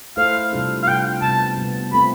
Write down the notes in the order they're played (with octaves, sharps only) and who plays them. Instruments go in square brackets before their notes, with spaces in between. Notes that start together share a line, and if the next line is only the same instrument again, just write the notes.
[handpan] A3 E4 A4 C5 [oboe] F5
[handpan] C3 G3 D4 F4 A4
[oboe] F5
[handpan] C3 G3 D4 F4 A4 [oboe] G5
[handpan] C3 G3 B3 [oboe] A5
[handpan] C3 G3 B3
[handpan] A3 C4 F4 [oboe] B5